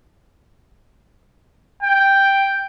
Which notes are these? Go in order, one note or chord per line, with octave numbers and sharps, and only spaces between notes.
G5